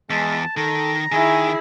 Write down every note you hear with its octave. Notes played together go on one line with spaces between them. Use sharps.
E2 G#3 A5
D#3 A4 A#5
D#3 E4 G#4 G#5